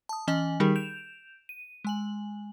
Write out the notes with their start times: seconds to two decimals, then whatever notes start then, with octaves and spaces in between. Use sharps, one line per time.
0.09 A5 D#6
0.27 E3 C#4 D#5 G#5 F#7
0.60 D#3 G3 D#4 G4 G#4 A#4
0.76 G6 D7 E7 F7
1.49 D#7
1.84 G#3 G#5 F#7